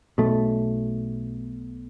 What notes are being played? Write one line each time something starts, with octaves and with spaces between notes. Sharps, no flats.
B1 B2 A3